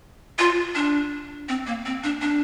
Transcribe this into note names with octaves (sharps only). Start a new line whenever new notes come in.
F4
D4
C4
A#3
C4
D4
D4